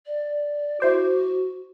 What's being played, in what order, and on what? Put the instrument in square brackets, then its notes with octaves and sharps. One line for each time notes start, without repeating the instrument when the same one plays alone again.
[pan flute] D5
[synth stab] E4 C5 D6 [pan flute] F#4